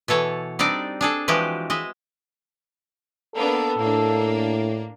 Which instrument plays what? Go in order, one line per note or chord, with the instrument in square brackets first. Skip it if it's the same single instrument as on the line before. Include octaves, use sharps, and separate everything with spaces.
[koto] B2 E3 A4 C#5
G3 C4 D4 D#4 D5
D4 G#4 A4
E3 F3 G#3 F#4 G4
G#3 D#5 E5
[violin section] A#3 B3 D4 [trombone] A4
[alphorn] A2 [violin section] A#3 D4